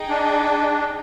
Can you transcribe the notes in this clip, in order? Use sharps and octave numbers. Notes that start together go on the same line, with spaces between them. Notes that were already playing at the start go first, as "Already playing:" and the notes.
Already playing: D#4 G#4 D#5 G5
D4